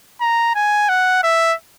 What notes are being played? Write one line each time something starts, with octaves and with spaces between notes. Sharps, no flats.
A#5
G#5
F#5
E5